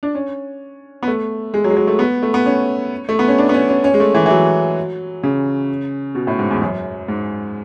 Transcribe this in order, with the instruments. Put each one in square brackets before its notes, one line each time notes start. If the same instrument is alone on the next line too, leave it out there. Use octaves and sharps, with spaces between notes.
[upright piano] D4
C#4
B3
A3
G#3
F#3
G#3
F#3
A3
B3
A3
B3
C#4
A3
B3
C#4
D4
B3
C#4
C#4
C#4
G#3
A3
E3
E3
F#3
C#3
B2
A2
G#2
E2
F#2
G#2